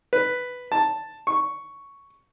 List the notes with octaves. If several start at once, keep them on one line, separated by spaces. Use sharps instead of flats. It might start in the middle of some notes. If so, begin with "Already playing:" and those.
B4
A5
C#6